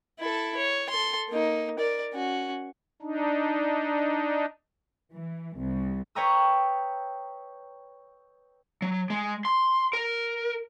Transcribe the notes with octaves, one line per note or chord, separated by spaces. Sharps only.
E4 A4
C#5
A4 C6
A#3 D#4
A#4 D5
C#4 F#4
D4 D#4
E3
C2
B4 C#5 G5 A#5 D#6 E6
F#3
G#3
C6
A#4